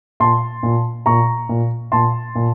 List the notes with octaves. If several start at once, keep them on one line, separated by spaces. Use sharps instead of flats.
A#2 A5 C6
A#2
A#2 A#5 C#6
A#2
A#2 A5 C6
A#2